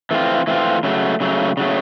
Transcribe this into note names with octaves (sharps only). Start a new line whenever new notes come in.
E3 A3 C4 F4
E3 A3 C4 F4
C#3 F#3 A3
C#3 F#3 A3
C#3 F#3 A3